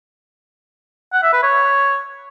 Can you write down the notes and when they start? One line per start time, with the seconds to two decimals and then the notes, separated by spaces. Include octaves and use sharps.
1.13 F#5
1.23 E5
1.33 B4
1.43 C#5